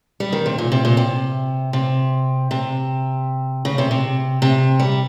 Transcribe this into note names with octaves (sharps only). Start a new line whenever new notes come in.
G3
D#3
C3
A#2
C3
A#2
C3
C3
C3
C#3
C3
C3
C3
G3